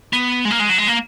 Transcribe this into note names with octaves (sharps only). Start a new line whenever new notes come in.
B3
G#3
A#3
G#3
F#3
G#3
A#3